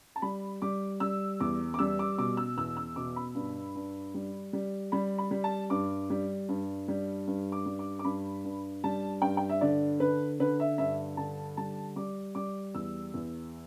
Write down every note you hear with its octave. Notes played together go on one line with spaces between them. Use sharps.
A5
G3 B5
G3 D6
G3 E6
E2 D6
D6
G3 E6
D6
B2 D6
E6
E2 E6
E6
B2 D6
B5
G2
G2
G3
G3
G3 B5
B5
G3
A5
G2 D6
G3
G2
G3
G2
D6
G3
D6
D6
G2 B5
G2
G3 A5
G2 G5
G5
E5
D3 D5
D3 B4
D3 B4
E5
G2 E5
D3 A5
G3 A5
G3 D6
G3 D6
E2 E6
E2